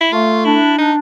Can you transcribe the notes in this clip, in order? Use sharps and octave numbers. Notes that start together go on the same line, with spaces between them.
E4
A3 F4
D4 E4
D4 D#4